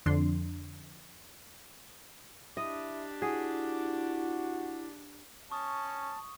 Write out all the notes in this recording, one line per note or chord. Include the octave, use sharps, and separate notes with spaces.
F2 D3 D4 C6
D4 E4 G4 D#5
E4 F#4 G#4
C#4 A5 C#6 D#6